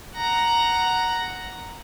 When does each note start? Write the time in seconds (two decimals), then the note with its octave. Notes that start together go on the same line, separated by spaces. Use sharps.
0.16 F#5 A#5